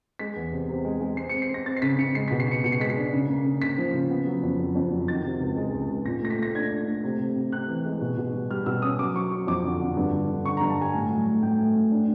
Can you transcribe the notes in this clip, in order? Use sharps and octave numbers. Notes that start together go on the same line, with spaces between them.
G#3 B6
E2
C3
C3
G#3
G#3
C4 C7
C#7
C4
C7
C4 A#6
C4 A6
C7
C#3 B6
C#3 C#7
G#3 C7
B2 B6
C7
B3 C#7
B2 C#7
C7
G#3 B6
C7
D4
C#3
A#3
C#3
C#3 B6
F3
C#3
B3
F#3
F2
F#3
F2
F#3
D#3 A6
C3
C#2
G#3
C#2
G#3
A#2 A#6
A3 A#6
B6
A3 A#6
D4 G#6
D4
A3
C3
C3
C3
C3 F#6
E3
G#3
B2
B2
G3
G3 F6
B2 E6
C#4 D#6
F#3 D6
F#3 C#6
F#3 C#6
F2 D6
D3
D3
G2
D3
D3
D3 C#6
A#5
G2
A5
G3 G#5
A2
F#3
A3
A2 G5
A3
A2
D4